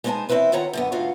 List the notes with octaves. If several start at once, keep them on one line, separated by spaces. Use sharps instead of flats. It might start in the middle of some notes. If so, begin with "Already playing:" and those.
G#3 B3 D#4 C5 G#5 A5
E3 C4 C#4 E4 B4 C5
D#3 F4 C#5 F#5 A#5
F#2 D3 B3
D2 G#2 B3 F4 F#4 F5